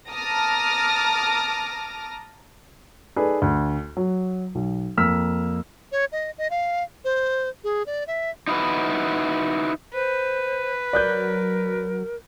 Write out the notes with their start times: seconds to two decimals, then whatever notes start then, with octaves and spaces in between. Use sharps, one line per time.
0.10 A5 A#5 D6 D#6 F6 A#6
3.16 D#4 G#4 A4 B4 D5
3.42 D2
3.97 F#3
4.55 B1
4.97 F2 A#3 E6 F6 B6
5.92 C#5
6.12 D#5
6.38 D#5
6.51 F5
7.05 C5
7.64 G#4
7.86 D5
8.07 E5
8.48 D#4 E4 F#4 B4
9.94 B4 C5
10.93 F#3 A#4 D5 F#6 G6